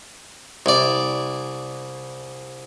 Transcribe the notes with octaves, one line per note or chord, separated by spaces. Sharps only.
C2 D5